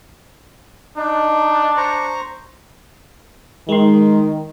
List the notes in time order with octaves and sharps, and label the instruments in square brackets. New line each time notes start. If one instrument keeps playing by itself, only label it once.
[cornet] D4 [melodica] D#4
[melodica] C5 A#5 C#6
[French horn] D#3 [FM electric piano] G#3 C6